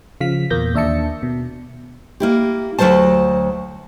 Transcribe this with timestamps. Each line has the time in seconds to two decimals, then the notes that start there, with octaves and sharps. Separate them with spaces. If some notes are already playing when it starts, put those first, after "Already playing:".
0.21 C#3 F3 F5 B6
0.50 E2 A#2 A#3 G6 A#6
0.74 D#2 D4 E5 A5 C#7
1.23 B2
2.20 A#3 E4 G4
2.79 D2 A#2 F#3 C5 A5